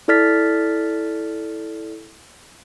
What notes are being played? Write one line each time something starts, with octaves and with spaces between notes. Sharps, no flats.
E4 A4 D5 F6 A6 B6